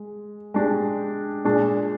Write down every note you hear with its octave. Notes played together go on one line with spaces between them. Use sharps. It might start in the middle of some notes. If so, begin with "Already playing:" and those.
Already playing: G#3
G#3 D4 G4
A#2 G#3 D4 G#4